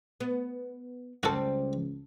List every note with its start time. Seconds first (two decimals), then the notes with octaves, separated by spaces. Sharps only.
0.20 B3
1.23 C#2 G3 C4 F#4 A4